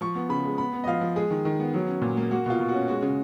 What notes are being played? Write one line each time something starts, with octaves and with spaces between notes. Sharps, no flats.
F3 C#6
B3
C#3 B5
G#3
B3 B5
B3
D#5
F3 F5
F3
G#3 G#4
D#3
D#3
B3
F#3
C#4
A#2
A#3
A#3 F#4
B2 F4
B2
C#4 F#4
G#3 F#4
C#3